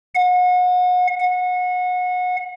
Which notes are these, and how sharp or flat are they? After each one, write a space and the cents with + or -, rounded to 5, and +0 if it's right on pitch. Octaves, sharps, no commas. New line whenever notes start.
F#5 -35
F#5 -30